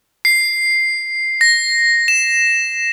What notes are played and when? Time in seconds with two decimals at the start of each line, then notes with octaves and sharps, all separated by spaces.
0.25 C7
1.41 A#6
2.08 E7